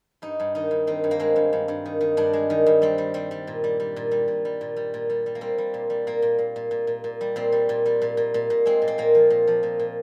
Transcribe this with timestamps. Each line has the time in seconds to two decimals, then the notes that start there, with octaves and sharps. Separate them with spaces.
0.22 G2 D#4
0.40 G2
0.55 D#3 D#4
0.71 G2
0.87 D#3 C4
1.04 G2
1.11 A#3
1.20 G#3 C4
1.36 G2
1.53 G2
1.68 G2
1.86 D#3
2.01 D#3
2.17 G2 D4
2.33 G#3
2.50 D#3
2.66 G2
2.82 G3 C4
2.98 G3
3.14 G3 C4
3.31 G3
3.47 A#2
3.64 G3
3.80 G3
3.96 A#2
4.11 G3
4.28 A#2
4.45 G3
4.61 A#2
4.76 G3
4.94 A#2
5.10 G3
5.26 G3
5.35 A#3
5.41 G3 C4
5.58 G3
5.74 A#2
5.90 G3
6.07 A#2 A#3
6.22 A#2
6.38 A#2
6.56 A#2
6.71 A#2
6.87 A#2
7.04 A#2
7.21 G3
7.36 A#2 C4
7.52 G3
7.69 A#2
7.86 G3
8.02 A#2
8.17 A#2
8.34 A#2
8.50 A#2
8.66 G#3 C4
8.82 A#2
8.88 C4
8.98 A#2 A#3
9.15 F3
9.30 A#2
9.47 F3
9.63 A#2
9.79 A#2